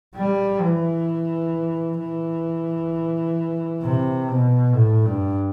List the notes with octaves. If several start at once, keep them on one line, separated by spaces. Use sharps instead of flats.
G3
E3
E3
C3
B2
A2
G2